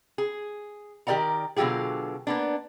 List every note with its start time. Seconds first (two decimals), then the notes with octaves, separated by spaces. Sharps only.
0.18 G#4
1.07 D#3 G4 A#4 D5 F#5 A#5
1.56 B2 D3 F#3 F4 G4 G#4
2.27 A#3 B3 D4